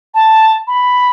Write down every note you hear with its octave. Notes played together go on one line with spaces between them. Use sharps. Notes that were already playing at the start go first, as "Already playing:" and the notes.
A5
B5